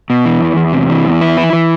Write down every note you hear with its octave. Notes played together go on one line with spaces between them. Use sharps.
B2
E3
E2
E2
C3
E3
E2
E4
E3
E3